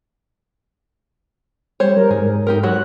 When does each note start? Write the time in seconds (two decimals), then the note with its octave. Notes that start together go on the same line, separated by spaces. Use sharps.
1.80 G3 C5 C#5
1.97 A#4
2.11 G#2 G#4
2.47 D#4 G4 A#4
2.63 F#3 F#4 C#5 F#6